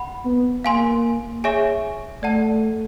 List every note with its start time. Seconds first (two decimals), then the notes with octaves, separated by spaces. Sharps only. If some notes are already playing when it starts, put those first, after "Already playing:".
Already playing: F#5 B5
0.26 B3
0.64 A#3 F5 G#5 C6
1.44 G#4 C#5 E5 G#5 C#6
2.23 A3 D5 F#5 A5